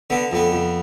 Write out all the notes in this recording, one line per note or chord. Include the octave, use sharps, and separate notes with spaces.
D3 B3
F2 B3
F2